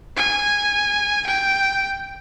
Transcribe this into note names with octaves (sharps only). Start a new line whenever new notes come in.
G#5
G5